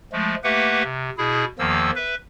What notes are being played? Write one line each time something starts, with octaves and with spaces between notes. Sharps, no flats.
F3 G#3 A3
A3 A#3 G4 B4 E5 F#5
C3
B2 E4 G#4
E2 D#3 F3 A#3 E6
B4 E5